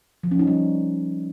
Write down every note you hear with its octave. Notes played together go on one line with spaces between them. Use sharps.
F3
C#4
D#4
G3